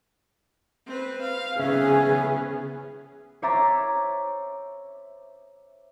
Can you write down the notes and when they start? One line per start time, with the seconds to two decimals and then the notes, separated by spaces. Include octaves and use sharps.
0.87 C4 B4
1.21 F5
1.60 C#3 B3 C#4 G#4 E5
3.42 C5 C#5 E5 A#5 D6 A6